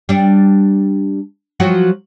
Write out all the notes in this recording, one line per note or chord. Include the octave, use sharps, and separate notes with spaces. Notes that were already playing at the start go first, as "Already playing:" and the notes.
G3 D4
F3 F#3 F#4